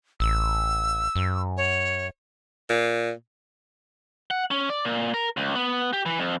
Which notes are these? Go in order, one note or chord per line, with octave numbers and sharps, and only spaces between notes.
A1 E6
F#2
C#5
A#2
F#5
C#4
D5
A#2
A#4
C#2
B3
G4
E3
F2